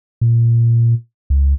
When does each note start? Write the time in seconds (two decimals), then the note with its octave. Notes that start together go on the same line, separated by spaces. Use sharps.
0.21 A#2
1.30 C#2